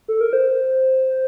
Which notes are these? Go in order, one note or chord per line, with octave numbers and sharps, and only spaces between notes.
A4
A#4
C5